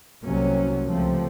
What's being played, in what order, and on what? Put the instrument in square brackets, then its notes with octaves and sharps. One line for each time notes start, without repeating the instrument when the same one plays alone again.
[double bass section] C2 C3 F#3 A#3 C#4
C#2 C3 F3 A3 C4